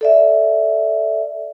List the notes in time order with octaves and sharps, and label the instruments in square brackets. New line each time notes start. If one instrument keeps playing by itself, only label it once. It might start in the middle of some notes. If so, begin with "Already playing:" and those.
[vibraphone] A4 D5 E5